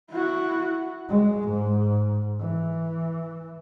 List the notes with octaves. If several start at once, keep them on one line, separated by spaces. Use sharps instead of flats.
E4 F#4
G#3
G#2
E3